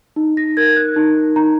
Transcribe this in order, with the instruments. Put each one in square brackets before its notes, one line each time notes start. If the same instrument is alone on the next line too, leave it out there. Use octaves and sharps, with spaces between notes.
[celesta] D#4
A#6
A#4 G#6
F#6
D#4
D#4 A#5